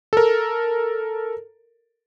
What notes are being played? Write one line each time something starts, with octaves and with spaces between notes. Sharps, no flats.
A4 A#4